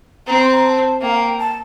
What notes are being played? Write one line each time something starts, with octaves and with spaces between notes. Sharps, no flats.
C4 A#5
C6
A#5
A5
A#3 G5
F5
G5
A5